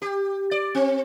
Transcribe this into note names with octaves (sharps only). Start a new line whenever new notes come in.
G4
D5
C4